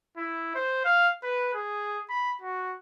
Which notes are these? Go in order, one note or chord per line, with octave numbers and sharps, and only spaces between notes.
E4
C5
F5
B4
G#4
B5
F#4